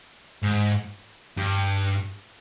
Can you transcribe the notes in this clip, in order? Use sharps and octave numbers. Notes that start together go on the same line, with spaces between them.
G#2
G2